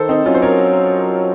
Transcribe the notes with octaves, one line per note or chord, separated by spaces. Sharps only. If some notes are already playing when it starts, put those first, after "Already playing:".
Already playing: D#3 A4 C5
C4 D#4
F#3 C#4 F4
C5
A#4 C#5